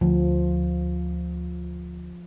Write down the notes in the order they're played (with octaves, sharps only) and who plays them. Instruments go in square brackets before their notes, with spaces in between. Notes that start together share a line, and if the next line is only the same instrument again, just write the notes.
[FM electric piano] D2 [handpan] F3